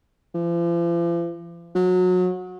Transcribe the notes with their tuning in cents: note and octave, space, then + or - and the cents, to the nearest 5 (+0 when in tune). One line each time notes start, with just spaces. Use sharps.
F3 -45
F#3 -25